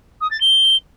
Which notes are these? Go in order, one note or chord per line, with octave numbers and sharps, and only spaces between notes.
D#6
A6
G7